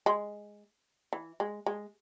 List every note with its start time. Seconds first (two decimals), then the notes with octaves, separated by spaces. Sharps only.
0.06 G#3
1.13 E3
1.40 G#3
1.66 G#3